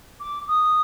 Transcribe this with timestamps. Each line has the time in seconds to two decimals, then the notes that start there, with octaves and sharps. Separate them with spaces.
0.20 D6
0.48 D#6